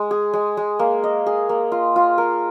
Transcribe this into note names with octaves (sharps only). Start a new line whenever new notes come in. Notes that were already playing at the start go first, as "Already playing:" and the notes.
Already playing: G#3
G#4
G#3
G#3
A#3
D#5
G#4
A#3
F4
F4
A#4